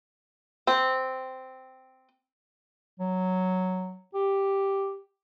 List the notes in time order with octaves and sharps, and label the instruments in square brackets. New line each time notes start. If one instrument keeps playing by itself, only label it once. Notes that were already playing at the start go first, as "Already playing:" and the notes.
[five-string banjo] C4
[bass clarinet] F#3
G4